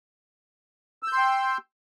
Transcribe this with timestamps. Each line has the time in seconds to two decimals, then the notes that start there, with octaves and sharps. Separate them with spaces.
1.03 E6
1.08 G6
1.12 C6
1.17 G5